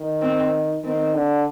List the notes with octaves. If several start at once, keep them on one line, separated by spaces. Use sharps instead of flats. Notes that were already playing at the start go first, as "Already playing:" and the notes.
Already playing: D#3
C4
D#3 C4
D3